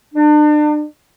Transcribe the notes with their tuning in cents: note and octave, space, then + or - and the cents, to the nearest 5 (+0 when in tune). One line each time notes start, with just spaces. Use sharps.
D4 +35